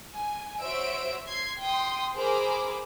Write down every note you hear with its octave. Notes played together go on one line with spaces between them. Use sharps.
G#5
F#4 C5 C#5 E5 E6 D7
C6 G#6 C7
G5 C6 D#6
G#4 A#4 C5 B5 D6